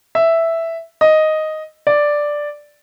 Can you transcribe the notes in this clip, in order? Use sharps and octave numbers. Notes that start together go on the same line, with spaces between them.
E5
D#5
D5